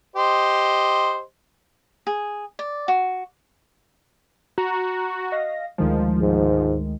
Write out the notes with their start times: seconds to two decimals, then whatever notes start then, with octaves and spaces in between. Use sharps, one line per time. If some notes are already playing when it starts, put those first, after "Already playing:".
0.16 G4 C5 D#5
2.07 G#4
2.59 D5
2.88 F#4
4.58 F#4 A#5
5.32 D#5 F5 A#6
5.78 D2 D#3 F3 G#3
6.21 G#2